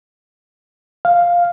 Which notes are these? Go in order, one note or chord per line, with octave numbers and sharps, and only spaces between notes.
F5